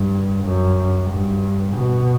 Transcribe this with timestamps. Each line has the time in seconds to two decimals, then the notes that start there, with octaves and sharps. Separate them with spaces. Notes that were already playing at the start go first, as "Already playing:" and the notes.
Already playing: G2
0.44 F#2
1.10 G2
1.75 B2